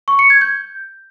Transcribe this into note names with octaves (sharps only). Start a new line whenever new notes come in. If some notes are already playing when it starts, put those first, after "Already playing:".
C#6
C#7
G#6
G6